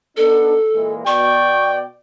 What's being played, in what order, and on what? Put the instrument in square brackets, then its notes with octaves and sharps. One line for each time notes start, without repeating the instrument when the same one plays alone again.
[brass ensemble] B3 D4 D#4 [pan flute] A4
[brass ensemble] A#2 E3 G#3
[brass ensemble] B2 D5 [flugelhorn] G5 [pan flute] C#6